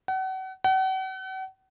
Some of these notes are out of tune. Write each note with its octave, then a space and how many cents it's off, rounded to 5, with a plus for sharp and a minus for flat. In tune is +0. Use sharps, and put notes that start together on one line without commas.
F#5 +35
F#5 +40